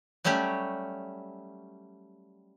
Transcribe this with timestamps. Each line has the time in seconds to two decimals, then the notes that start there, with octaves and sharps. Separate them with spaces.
0.24 F#3 G3 A3 C#4 G4